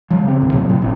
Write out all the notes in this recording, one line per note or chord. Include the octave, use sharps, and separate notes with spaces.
F3 G#3
C#3 C4
C2 A2 D#3
C3 F3 F#3 A#3
A2
G#1 C3 D4